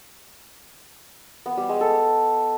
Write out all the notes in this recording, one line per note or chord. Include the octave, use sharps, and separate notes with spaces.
B3
G3
G#3
A4